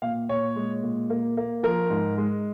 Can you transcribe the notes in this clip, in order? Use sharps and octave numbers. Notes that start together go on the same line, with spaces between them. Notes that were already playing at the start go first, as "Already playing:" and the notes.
A#2 F5
A#2 C#5
G#3
A#2
A#3
A#3
F3 A#4
G#2
G#3